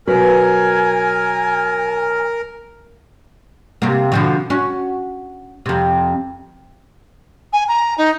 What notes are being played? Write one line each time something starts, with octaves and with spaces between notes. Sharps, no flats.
B2 F#3 A#4 B4 G#5
C3 A#3
B2 D3 F3
C#4 F#4
F2 C3
G#5
A#5
D#4